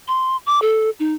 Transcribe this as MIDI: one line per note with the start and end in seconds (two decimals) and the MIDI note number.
0.08 0.37 84
0.46 0.59 86
0.62 0.90 69
1.00 1.14 63